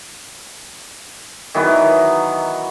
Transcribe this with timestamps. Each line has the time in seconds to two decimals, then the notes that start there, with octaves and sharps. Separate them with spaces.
1.55 D#3 E3 F#3 B3